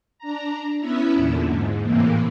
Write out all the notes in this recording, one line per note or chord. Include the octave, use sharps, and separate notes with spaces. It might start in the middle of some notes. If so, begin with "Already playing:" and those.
D4 A#5
B3 C#4 E4 E5
E2 A#2 D3
G#2
A2 C3 E3 A#3